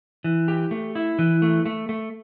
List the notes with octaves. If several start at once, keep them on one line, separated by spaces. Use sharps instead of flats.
E3
G4
A3
E4
E3
A3
A3
A3